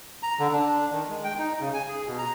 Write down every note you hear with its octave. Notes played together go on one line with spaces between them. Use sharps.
A#5
D3
D4
D#3
G#3
G5
D#4
C#3
G#5
G#4
B2
A#5